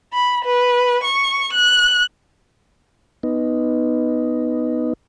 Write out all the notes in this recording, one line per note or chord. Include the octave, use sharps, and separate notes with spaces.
B5
B4
C#6
F#6
B3 D#4